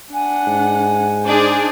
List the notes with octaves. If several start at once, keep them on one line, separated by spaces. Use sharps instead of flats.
D4 F#5 G#5
G#2
D4 D#4 G#4 C5